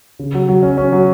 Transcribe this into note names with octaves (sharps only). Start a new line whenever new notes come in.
C#3
F#3
F#3
C#4
C#4
F#3